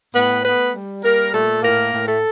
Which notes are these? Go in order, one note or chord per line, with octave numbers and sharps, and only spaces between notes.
A2 B3 B4
A3 B3 B4
G3
G3 A#3 A#4
A#2 A3 A4
A2 A#3 A#4
A2
A3 A4